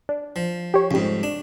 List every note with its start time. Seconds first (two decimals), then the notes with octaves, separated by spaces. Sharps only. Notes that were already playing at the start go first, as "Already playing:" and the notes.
0.09 D4
0.36 F3
0.74 G4 C#5
0.91 F2 G#2 C#3 G3
1.23 D4